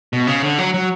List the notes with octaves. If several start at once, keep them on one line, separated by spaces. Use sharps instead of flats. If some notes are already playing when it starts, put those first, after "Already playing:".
B2
C#3
D3
F#3
F#3